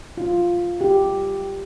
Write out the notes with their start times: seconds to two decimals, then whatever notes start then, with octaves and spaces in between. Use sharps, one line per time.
0.18 F4
0.81 G4